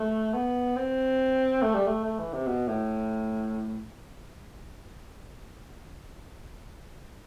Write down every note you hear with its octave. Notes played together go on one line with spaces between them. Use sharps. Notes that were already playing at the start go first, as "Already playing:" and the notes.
Already playing: A3
B3
C4
A3
G3
A3
A3
E3
C3
B2
A2